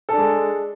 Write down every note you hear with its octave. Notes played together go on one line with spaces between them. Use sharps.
G#3 D4 A4